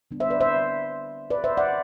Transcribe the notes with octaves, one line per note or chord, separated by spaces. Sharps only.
D3 G3 B3 D4
C5 E5
B4 D5
C5 E5
B4 D5
C5 E5
D5 F#5